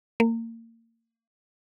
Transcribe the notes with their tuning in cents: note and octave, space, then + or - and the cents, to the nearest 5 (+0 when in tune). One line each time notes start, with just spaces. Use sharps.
A#3 -30